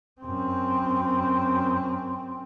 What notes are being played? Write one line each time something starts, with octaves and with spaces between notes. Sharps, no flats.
F#2 C4